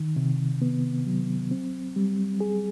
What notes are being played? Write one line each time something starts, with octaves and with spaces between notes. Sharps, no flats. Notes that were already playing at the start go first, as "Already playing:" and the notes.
Already playing: D#3
C3
B3
F#3
C4
G3
G#4